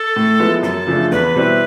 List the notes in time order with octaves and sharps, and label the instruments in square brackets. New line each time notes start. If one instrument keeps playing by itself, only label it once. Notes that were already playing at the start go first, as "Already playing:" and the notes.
Already playing: [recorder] A4
[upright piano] A2
F3 G#3 B3 E4
[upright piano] F#2 [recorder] A4
[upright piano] C#3 F3 A3 D4
[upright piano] E2 [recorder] B4
[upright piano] B2 G3 C4 E4